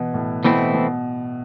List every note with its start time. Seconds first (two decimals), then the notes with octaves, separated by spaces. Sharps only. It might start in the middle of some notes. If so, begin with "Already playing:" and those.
Already playing: B2 E3
0.14 A2
0.44 B2 E3 A3 C4 E4
0.74 B2